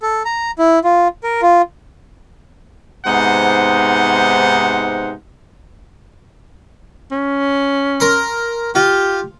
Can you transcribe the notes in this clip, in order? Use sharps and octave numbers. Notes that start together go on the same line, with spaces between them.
A4
A#5
E4
F4
A#4
F4
G#2 C3 B3 D#4 C5 F#5
C#4
A#4 C6
F4 G4